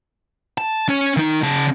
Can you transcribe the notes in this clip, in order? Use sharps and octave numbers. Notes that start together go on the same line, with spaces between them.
A5
C#4 C#5
D#3 D#4
C#3 A5